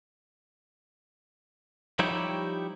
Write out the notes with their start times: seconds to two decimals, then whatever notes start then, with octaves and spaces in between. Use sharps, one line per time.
1.99 F3 G3 D#4 E4 G4 C#5